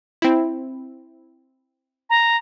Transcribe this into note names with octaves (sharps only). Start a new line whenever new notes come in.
C4 E4
A#5